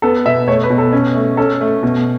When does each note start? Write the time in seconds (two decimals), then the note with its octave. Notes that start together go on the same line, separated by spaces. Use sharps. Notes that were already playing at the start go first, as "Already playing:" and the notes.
0.02 B3 A4
0.26 B2 E5
0.48 A3 C#5
0.63 B4
0.70 B2
0.78 A4
0.93 C#4
1.15 A3
1.37 C#4 A4
1.61 A3
1.83 B2